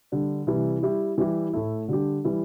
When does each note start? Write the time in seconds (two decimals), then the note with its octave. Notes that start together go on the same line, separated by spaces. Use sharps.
0.12 D3 G3 D4 G4
0.47 C3 E3 G3 E4
0.83 G3 E4 G4
1.18 E3 G3 E4 G4
1.53 A2 A3 E4
1.88 D3 G3 D4 G4
2.24 E3 G3 E4